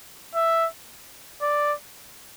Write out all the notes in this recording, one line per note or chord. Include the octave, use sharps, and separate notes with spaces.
E5
D5